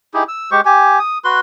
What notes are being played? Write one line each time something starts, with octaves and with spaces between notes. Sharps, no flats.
D#4 E4 G4 G#4
E6
G#3 G4 C5 C#6
G4 G#5
D#6
F#4 B4 C6